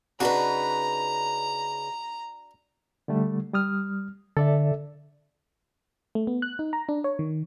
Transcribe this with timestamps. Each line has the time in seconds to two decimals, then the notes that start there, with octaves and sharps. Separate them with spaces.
0.20 C#3 D4 D#4 F#4 B4 A#5
3.08 D3 G3 A3
3.54 G3 D#6 F6
4.37 D3 A4 D5 E5
6.15 A3
6.27 B3
6.42 F#6
6.59 D#4
6.73 A#5
6.89 D4
7.04 C#5
7.19 D#3